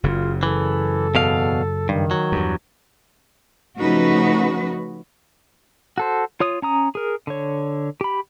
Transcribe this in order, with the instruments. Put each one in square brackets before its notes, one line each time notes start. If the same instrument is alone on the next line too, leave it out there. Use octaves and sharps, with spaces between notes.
[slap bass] F#1 C#3 [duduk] F4
[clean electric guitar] E3 [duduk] A4
[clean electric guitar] E2 B2 F5
[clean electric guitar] G2 [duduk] D#3
[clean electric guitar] F#3
[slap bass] E2 G2
[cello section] C#3 F3 A3 D#4 F#4 B4
[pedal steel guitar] F#4 A4 C5
F4 C#5 D#6
C#4 A#5 D#6
G#4 A#4
D3 C#5
G4 B5